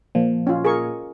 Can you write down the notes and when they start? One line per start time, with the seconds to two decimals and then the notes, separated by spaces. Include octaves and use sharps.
0.15 A#2 F3
0.47 C#4 F4
0.65 G#4 A#4 C#6